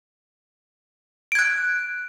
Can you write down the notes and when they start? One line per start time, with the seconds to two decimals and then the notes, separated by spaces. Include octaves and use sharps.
1.32 D7
1.35 G#6
1.39 F#6